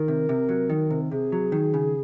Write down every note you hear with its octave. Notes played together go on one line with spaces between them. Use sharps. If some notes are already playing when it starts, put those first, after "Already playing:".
Already playing: D#3 A#4
C3
C3
F#3
D#3
C3
C3 G#4
F#3
D#3
C#3